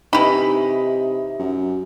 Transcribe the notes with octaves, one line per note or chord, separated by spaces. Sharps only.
C3 E3 D#4 B5
F#2